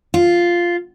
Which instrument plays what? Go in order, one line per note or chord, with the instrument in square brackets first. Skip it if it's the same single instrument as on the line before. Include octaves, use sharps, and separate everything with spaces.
[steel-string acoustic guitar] F4